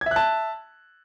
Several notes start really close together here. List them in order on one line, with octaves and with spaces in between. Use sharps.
G#6 E5 F#6 A5